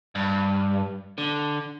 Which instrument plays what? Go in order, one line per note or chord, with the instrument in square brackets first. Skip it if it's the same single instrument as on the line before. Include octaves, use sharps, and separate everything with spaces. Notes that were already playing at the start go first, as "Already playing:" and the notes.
[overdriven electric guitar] G2
D3